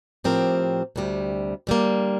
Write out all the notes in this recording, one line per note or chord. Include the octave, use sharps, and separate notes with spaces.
A2 F3 C4 G4 A#4
D2 C3 G3
D3 G3 A#3